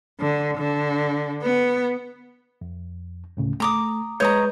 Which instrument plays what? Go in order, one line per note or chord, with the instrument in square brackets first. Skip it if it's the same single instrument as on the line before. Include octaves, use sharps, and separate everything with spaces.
[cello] D3
D3
B3
[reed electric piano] F2
D2 A2 C#3
[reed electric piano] A3 [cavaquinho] A#5 D6 D#6
[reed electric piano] G#3 B4 G6 [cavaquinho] C#5 D#5 A#5